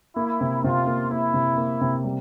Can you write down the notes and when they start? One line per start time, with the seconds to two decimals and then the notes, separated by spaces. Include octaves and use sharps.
0.16 A#3 E4
0.41 C3
0.64 C3 F4
0.87 A#3
1.10 A#3 E4
1.34 C3
1.57 A#3
1.81 C3
2.04 G3